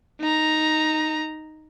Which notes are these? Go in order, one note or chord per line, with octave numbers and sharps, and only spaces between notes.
D#4 A#5